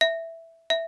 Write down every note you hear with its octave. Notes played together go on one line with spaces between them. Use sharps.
E5
E5